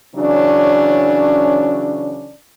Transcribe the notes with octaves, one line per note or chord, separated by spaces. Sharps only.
C#3 E3 F#3 C#4 D4